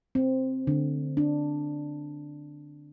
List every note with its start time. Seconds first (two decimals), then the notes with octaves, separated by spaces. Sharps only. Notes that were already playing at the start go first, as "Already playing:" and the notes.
0.15 C4
0.67 D3
1.17 D4